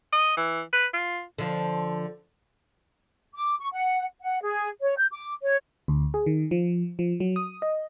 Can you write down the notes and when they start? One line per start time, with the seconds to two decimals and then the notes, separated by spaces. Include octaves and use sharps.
0.13 D#5
0.37 E3
0.73 B4
0.94 F4
1.38 D3 F3
3.35 D6
3.60 C#6
3.72 F#5
4.22 F#5
4.42 G#4
4.81 C#5
4.97 G6
5.11 D6
5.42 C#5
5.88 D2
6.14 G#4
6.26 D#3
6.51 F3
6.99 F3
7.20 F#3
7.36 D#6
7.62 D#5